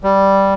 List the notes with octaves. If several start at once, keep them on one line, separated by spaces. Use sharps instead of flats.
G3